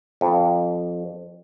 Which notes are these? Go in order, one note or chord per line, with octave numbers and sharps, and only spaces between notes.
F2